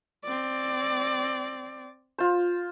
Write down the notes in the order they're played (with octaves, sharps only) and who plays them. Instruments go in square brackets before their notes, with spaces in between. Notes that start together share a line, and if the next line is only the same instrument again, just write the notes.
[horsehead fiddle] C4 D5
[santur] F4 C5